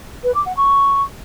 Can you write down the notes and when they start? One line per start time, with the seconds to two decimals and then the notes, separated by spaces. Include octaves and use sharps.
0.24 B4
0.35 D6
0.46 F#5
0.57 C#6